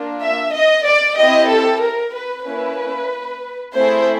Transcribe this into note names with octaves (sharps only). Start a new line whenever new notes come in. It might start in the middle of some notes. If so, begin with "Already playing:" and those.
Already playing: A#3 D4 F4
E5
D#5
D5
C4 E4 G4 D#5
A4
A#4
B4
A#3 C#4 E4 B4
A3 C4 E4 G#4 C5